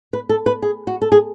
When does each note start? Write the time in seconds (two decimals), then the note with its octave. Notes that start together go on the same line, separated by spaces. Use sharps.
0.13 B4
0.29 A4
0.46 B4
0.62 G#4
0.87 F#4
1.02 A4
1.12 G#4